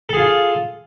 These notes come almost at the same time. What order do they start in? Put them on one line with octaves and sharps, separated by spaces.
A4 G#4 F4